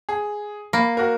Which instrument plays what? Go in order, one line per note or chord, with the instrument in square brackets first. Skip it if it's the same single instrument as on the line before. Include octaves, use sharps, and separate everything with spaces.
[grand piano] G#4
[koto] A#3 [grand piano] B5
[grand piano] F#4 A#4